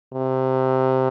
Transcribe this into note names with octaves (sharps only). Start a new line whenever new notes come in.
C3